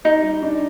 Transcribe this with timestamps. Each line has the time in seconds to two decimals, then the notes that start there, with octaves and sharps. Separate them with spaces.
0.04 D#4 G4
0.23 G3
0.42 D4